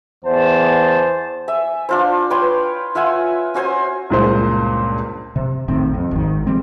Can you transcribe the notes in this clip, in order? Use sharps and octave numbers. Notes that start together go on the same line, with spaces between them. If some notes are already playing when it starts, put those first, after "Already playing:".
E2 C5 A5
E5 G#5
D4 F4 C5
B4 C#5 G5 C6
F4 E5 F#5 G#5
C#4 F#4 C5 G#5
C#2 G2 A#2 G#3 C5
C3
A#1 A2 D#3 C4
F2
G#1 D#3
E3 G3 C4